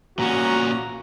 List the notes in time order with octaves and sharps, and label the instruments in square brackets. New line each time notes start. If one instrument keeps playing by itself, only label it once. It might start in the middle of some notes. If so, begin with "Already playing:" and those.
[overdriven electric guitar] A#2 C#4 [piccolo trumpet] F#4 [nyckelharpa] A#5